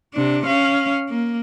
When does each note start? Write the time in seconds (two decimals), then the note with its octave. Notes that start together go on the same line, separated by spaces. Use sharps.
0.14 C3 D4
0.46 C#4 F5
1.09 A#3